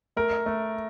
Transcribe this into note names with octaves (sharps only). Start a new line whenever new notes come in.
A3 A#4
A3